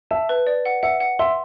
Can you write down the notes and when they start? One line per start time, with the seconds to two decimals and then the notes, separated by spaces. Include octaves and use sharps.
0.11 E5 A5
0.29 B4
0.46 D5
0.65 F#5
0.83 E5 F#5
1.00 F#5
1.19 E5 C6